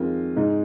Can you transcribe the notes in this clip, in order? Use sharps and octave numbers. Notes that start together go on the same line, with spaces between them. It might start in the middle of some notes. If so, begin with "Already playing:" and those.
Already playing: F2 D#3 G#3 F4
G#2 G#3 D#4